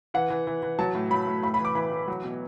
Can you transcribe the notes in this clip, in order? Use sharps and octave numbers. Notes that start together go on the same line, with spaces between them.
E3 F#5
E3
E3
E3
F#3 A5
A2
F#3 B5
A2
A2 B5
B5
E3
D6
E3 B5
E3
F#3
B2